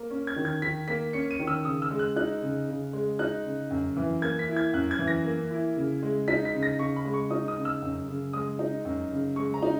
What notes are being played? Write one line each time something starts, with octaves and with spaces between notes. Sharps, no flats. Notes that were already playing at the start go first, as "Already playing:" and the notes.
Already playing: A#3
C#4
G#6
D#3
G#6
D#3 B6
A#3 B6
C#4 C#7
D#7
D#3
E6
C#3 D#6
E6
G#3
F#6
D#4 F#6
C#3
C#3
G#3
D#4 F#6
C#3
F#2
E3
A#3 G#6
B6
E4
G#6
F#2 F#6
G#6
E3
A#6
A#3
E4
C#3
G#3
D#4 B6
B6
C#3
A#6
C#3 C#6
B5
G#3
C#6
D#4 D#6
D#6
C#3
E6
F#2
C#3
G#3 D#6
D#4
F#2
C#3
G#3 C#6
A#5
D#4